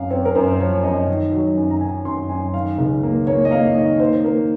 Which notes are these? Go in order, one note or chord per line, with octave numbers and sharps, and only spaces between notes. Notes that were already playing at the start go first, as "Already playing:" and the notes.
Already playing: F#2 F5
C4 C#5
A#4
F#2 C5
C5
F3 C#5
F#2 D#5
D#3
F#3
F#2
A#5
D#3 G#5
F#2 C6
F#2 G#5
D#3 F5
C#2
A#3
A#3 C#5
D#5
A#3 F5
D#3 D#5
A#3 C5
A#3 A#4